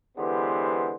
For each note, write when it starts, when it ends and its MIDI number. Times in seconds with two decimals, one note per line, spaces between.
0.18 0.96 50
0.18 0.96 52
0.18 0.96 56
0.18 0.96 59
0.18 0.96 67
0.18 0.96 72